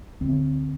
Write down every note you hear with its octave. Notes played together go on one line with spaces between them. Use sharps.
D2 D3 C4